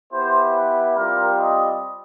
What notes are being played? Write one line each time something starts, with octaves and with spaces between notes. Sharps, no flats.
B3 E4 G4 C5
B4
G3 C4 F4 A#4
D#5